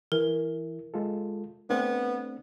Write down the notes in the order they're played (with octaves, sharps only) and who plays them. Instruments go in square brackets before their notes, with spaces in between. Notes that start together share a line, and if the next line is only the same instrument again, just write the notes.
[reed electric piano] E3 E4 [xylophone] A#4
[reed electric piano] G#3 F4 A4
[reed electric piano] A3 C4 D4 [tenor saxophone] B3